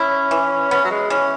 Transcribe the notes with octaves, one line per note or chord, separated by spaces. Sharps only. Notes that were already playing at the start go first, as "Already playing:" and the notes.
Already playing: C#4 E4
E3
B3 C#4
F#3
G#3
E3 C#4